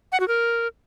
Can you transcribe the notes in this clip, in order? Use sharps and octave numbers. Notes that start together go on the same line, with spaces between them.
F#5
F#4
A#4